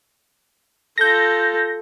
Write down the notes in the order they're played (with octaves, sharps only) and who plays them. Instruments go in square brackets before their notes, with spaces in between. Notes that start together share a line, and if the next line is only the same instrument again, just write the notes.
[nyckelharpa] F4 A4 [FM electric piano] G6 A#6